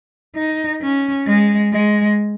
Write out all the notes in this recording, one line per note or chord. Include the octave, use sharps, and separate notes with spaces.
D#4
C#4
G#3
G#3